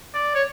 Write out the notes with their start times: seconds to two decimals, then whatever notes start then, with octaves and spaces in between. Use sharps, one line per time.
0.14 D5
0.35 C#5